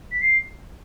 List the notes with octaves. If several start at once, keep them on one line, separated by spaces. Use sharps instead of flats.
B6
C7